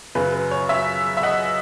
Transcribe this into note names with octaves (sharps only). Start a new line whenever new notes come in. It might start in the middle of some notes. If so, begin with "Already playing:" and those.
F#2 C#3 F#3 B4
B4
C#5
C#5 E5
E5
D#5 F#5